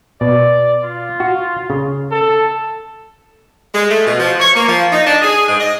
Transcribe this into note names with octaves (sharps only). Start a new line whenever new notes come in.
B2 D5
F4
F#4
C#3
A4
G#3
A3
B2
F3
C#5
A#3
F3
D#4
D4
G#4
G#2
D#5